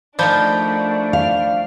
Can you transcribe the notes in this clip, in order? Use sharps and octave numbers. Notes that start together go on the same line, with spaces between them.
F3 A3 D4 D#4 A#4 D5 B5 G6
F5